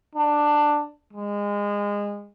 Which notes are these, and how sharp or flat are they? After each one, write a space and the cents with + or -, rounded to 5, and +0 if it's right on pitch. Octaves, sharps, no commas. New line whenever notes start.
D4 +10
G#3 -25